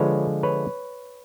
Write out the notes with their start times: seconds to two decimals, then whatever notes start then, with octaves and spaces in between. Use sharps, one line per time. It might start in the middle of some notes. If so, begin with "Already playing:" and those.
Already playing: D3 F3 G#3 B4 C#5
0.43 B4 C#5